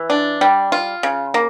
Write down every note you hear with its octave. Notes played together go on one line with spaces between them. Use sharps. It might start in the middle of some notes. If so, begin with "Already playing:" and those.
Already playing: E3
D4
G3
F4
C#3
A#3